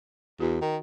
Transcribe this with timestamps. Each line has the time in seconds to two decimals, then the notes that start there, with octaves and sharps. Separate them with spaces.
0.40 E2 F#4
0.61 D#3